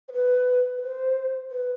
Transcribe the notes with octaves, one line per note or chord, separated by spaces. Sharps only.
C5
B4
B4
C5
B4